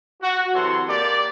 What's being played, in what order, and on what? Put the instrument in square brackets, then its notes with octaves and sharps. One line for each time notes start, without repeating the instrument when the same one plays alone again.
[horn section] F#4
C3 E3 F#3 A4 C#5 C6
A#3 G4 D5